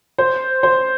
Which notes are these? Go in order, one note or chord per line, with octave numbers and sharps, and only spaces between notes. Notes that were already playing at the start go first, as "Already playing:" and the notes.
C5
C5